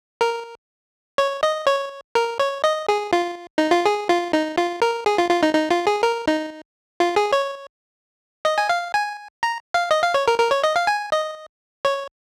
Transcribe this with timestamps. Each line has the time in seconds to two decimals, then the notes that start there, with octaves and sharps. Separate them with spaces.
0.21 A#4
1.18 C#5
1.43 D#5
1.67 C#5
2.15 A#4
2.39 C#5
2.64 D#5
2.88 G#4
3.13 F4
3.58 D#4
3.71 F4
3.85 G#4
4.09 F4
4.33 D#4
4.58 F4
4.82 A#4
5.06 G#4
5.18 F4
5.31 F4
5.43 D#4
5.54 D#4
5.71 F4
5.87 G#4
6.03 A#4
6.27 D#4
7.00 F4
7.16 G#4
7.32 C#5
8.45 D#5
8.58 G#5
8.69 F5
8.94 G#5
9.43 A#5
9.74 F5
9.91 D#5
10.03 F5
10.14 C#5
10.28 A#4
10.39 A#4
10.51 C#5
10.64 D#5
10.76 F5
10.87 G#5
11.12 D#5
11.85 C#5